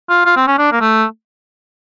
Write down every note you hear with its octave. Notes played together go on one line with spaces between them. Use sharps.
F4
F4
C4
C#4
D4
A#3
A3